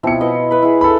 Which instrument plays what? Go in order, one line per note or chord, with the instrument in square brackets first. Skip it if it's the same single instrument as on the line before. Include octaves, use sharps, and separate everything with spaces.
[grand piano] B2 C#7 [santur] F3 C4 E4
[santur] E4 B4 D#5
B4 B5
E4 G#4
[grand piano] A4 B5 [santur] F5